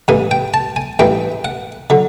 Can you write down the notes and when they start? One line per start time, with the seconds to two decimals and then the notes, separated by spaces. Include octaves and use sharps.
0.08 A1 G2 E3 G#5
0.31 G5
0.54 A5
0.76 G#5
0.99 A1 G2 E3 G5
1.45 F#5
1.90 D3 F#3